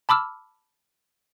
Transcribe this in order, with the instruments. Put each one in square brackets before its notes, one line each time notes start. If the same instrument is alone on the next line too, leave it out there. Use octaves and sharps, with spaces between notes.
[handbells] A5 B5 D6 E6 F6